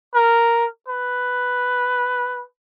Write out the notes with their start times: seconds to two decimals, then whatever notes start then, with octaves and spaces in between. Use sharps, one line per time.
0.14 A#4
0.88 B4